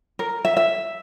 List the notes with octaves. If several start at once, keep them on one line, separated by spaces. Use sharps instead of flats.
A#4
E5
E5